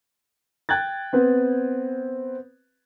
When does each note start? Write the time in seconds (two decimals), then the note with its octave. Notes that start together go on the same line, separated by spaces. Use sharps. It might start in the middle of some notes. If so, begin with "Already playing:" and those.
0.69 G5 F#6 G#6 A6
1.13 B3 C4 B4